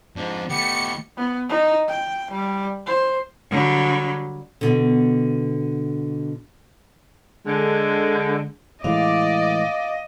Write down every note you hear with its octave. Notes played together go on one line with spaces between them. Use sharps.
F2 G#2 D4
D#3 A3 B3 G4 C#7
B3
D#4
G5
G3
C5
D3 F#3 G3
B2 D3
D3 G#3
A2 E3 G#3 D5 D#5 F5 D6